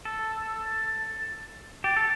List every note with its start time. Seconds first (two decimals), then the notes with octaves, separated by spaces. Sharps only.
0.05 A4 E6
0.36 E6
0.65 A6
1.84 G4 A6
1.96 A4